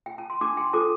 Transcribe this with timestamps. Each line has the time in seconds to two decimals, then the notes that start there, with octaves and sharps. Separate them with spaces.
0.06 G5
0.18 A5
0.30 C6
0.41 D4 A5 D6
0.57 G5 C6
0.73 F4 A4 C5 A5 D6